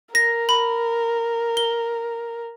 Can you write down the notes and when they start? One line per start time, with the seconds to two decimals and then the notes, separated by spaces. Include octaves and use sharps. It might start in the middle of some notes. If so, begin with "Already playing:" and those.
0.15 A#4 A#6
0.49 B5
1.57 G7